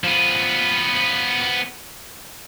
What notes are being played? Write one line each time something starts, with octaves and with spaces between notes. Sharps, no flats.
F3 B3